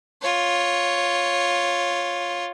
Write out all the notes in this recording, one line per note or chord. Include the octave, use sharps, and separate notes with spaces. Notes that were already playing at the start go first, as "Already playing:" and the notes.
F4 C#5